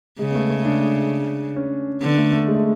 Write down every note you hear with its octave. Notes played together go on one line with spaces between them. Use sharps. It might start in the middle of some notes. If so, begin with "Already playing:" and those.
C#3 G#3
B3
A3
A3
D4
C#4
D3 B3
A3
A3
G#3
A3